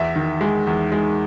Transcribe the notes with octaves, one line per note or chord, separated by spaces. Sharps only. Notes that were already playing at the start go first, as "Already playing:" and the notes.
Already playing: E2 E5
D#3
G#3
E2
G#3